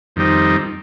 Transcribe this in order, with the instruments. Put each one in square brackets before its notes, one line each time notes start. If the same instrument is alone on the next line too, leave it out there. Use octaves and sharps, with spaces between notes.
[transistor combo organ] F2 D#3 G3 C4 D#4